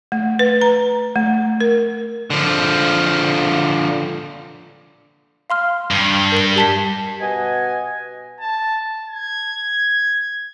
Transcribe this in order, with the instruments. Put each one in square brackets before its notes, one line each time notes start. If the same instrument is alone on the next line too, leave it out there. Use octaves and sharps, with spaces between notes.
[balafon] A3
B4
A#5
A3
A#4
[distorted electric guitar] D3 F3
[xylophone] F5 C6 F6
[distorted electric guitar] G2
[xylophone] A#4 G7
G4 A5 B6
[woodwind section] B2 D#5 F#5 G#5
[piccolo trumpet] A5
G#6